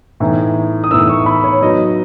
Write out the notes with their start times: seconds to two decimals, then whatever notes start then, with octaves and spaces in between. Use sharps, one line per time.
0.20 A2 E3 B3 D#4
0.84 D#6
0.91 A2 E3 B3 D#4 E6
1.09 C#6
1.26 B5
1.44 C#5
1.62 F#3 B3 D#4 D#5